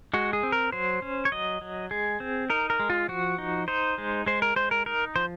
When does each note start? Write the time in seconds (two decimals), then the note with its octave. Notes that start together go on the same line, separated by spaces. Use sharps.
0.14 G#3 F#4
0.33 G#4
0.43 C4
0.52 A#4
0.72 F#3 C5
1.02 C#4
1.25 C#5
1.32 F#3 D#5
1.61 F#3
1.91 G#3 G#4
2.20 C4
2.50 D#4 A#4
2.70 A#4
2.80 G#3
2.90 F4
3.08 F3 F#4
3.38 D#4
3.68 D#4 C5
3.98 G#3
4.26 G#3 C5
4.42 A#4
4.56 G#3 C5
4.71 A#4
4.86 D#4 A#4
5.16 F3 C5